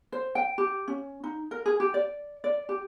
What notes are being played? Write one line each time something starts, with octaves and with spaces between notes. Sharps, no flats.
C5
G5
G4
C#4
D#4
A#4
G#4
G4
D5
D5
G4